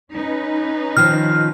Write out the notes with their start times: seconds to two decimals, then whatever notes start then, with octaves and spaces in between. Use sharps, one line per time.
0.12 C#4 D#4 B4
0.97 D#3 F3 F6